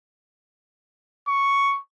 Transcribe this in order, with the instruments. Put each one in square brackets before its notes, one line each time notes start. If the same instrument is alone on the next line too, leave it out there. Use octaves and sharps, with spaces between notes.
[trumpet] C#6